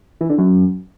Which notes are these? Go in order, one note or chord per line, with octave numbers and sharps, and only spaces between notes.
E3
D3
F#2